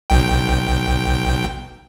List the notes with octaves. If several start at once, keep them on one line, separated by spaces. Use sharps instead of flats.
B1 G5